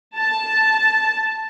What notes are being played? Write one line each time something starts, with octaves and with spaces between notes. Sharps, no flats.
A5